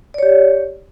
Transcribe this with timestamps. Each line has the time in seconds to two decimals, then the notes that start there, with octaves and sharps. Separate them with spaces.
0.14 D5
0.18 C#5
0.23 G4